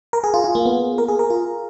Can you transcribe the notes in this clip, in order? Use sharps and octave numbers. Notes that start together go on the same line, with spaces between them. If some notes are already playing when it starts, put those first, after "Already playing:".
A#4
G#4
F4
F4
A#3
B3
A#4
G#4
A#4
F4